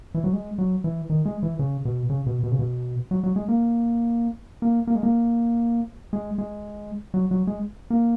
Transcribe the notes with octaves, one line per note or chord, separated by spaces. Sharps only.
E3
F#3
G#3
F#3
E3
D#3
G#3
E3
C#3
B2
C#3
B2
B2
C#3
B2
F#3
F#3
G#3
A#3
A#3
A#3
G#3
A#3
G#3
G#3
F#3
F#3
G#3
A#3